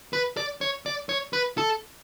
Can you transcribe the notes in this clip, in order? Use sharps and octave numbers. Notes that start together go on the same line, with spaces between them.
B4
D5
C#5
D5
C#5
B4
A4